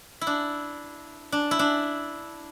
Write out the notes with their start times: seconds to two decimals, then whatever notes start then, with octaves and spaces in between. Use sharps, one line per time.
0.21 E4
0.27 D4
1.32 D4
1.51 E4
1.59 D4